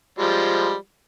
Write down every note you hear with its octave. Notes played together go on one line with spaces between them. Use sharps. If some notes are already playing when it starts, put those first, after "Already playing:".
F3 G3 G#3